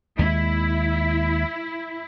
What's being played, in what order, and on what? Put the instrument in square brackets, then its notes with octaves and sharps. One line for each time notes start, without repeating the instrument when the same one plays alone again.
[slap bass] D#2 G#3 [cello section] E4